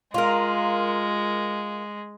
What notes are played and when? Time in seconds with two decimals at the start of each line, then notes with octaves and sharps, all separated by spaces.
0.14 G#3 F4 A#4